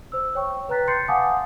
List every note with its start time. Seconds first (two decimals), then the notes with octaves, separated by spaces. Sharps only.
0.12 C5 E6
0.35 C#5 G5 C#6
0.69 B4 G5 A#5 F#6 A6 B6
0.88 C6 G6 A6 C7 C#7
1.08 F5 F#5 G#5 A5 D6 D#6